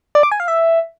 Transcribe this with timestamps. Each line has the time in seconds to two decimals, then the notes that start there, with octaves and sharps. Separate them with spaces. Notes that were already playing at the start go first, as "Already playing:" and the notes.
0.15 D5
0.23 D6
0.32 G#5
0.40 F5
0.48 E5